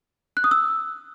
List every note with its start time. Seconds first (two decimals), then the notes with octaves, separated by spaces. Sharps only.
0.37 F#6
0.44 D#6
0.51 E6